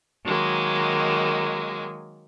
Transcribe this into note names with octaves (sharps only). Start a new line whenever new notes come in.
D#3 F#3 G#3 A#3